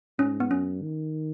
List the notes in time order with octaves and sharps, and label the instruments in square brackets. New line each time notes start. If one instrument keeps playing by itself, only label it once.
[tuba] G#2 [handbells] C#4
[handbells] B3
[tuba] F#2 [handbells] C#4
[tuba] D#3